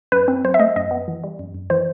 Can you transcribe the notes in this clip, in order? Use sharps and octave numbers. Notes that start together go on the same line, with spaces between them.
F#2 B4
C4
F#3 C5
E5
A3 D#5
F#2 D#5
B3
E3
G3
F#2
F#2
E3 C5